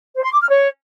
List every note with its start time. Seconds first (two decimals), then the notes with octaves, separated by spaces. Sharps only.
0.16 C5
0.24 C6
0.32 D6
0.41 F6
0.49 C#5